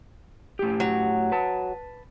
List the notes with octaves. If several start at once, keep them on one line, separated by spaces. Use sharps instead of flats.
A2 G4
F#3
B4 A5